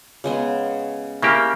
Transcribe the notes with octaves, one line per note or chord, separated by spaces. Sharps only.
C#3 G#3 B3
C#3 A#3 E4 G4